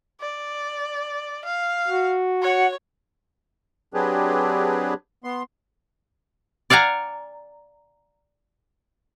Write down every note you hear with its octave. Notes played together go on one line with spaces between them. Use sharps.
D5
F5
F#4
C#5 F#5
F#3 C4 D4 G4 G#4 B4
B3 C6
D5 F5 F#5 G#5 A#5